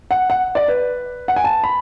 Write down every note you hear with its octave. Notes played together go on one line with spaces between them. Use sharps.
F#5
F#5
D5
B4
F#5
G#5
A5
B5